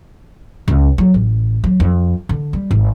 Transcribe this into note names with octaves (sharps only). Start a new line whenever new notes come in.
C#2
F#3
A1
F#3
F2
D3
G3
G#1